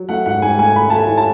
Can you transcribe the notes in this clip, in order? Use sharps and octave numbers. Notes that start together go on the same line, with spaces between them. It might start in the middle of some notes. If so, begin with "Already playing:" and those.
Already playing: F#3
A3 F#5
G#2 F#5
G#2 G#5
A3 G#5
A3 B5
A3 A5
E4 G#5
A5